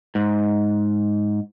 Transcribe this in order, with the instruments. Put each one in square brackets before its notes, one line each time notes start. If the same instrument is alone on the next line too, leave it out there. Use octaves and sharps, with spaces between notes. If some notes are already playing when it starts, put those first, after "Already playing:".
[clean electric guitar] G#2